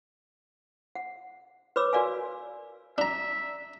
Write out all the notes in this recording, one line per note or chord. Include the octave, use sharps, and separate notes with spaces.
F#5
B4 C#5 B5 D6 E6
F#4 A#4 D5 F5 G#5
D4 E5 A#5